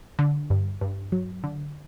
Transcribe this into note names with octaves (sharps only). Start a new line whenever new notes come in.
D3
G2
G2
F#3
D3